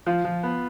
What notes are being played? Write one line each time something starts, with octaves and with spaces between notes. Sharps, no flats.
F3 F4
F3
B3